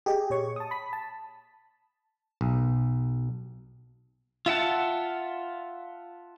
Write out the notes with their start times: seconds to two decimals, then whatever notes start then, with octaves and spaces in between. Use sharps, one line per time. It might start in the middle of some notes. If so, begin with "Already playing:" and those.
0.06 G4 G#4 D#5
0.30 A#2 C#5 C#6
0.56 A5 D#6
0.71 B5 B6
0.93 A5
2.41 B1
4.46 F4 E5 F#5 A5